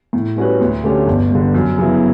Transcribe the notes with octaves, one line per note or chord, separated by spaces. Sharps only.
A2
G3 C#4 F#4 B4
D2
D3 A3 C#4 G4
G1
G2 D3
F#2
C#3 F#3 B3 E4